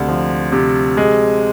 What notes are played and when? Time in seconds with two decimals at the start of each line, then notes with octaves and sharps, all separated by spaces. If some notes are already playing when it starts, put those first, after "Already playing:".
Already playing: D2 C3
0.08 F3
0.52 C3
0.97 G#3